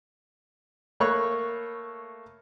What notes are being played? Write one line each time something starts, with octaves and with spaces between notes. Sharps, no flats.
A3 A#3 C#5 B5 C#6 F#6